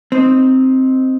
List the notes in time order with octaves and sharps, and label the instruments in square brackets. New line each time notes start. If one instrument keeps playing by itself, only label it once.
[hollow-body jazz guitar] C4 D#4